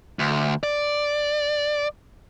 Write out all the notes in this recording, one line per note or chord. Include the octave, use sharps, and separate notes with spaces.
D2
D5